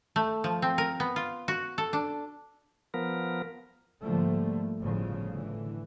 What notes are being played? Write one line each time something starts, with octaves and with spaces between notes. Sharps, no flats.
A3
F3
C4
A#4
B3
F4
F#4
A4
D4
F3 B3 A#4
G#2 D3 F3 G3 A3 A#3
G1 A2 C#3 F3
A2 D3 E3